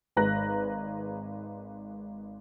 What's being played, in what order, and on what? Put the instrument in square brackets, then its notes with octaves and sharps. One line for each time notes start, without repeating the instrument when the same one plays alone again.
[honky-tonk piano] G#1 G#3 B4 A#5 F#6 A#6